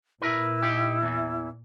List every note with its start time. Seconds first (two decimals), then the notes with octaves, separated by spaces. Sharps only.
0.22 A#2 E4 A#4 B4
0.62 D#4 G4
1.02 E2 E3